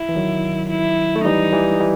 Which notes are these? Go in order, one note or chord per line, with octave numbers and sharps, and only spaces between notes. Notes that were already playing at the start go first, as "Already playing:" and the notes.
Already playing: E4
E3
D#3 F#3
E4
A3
E3 G3 D#4
E3 G3
E3 G3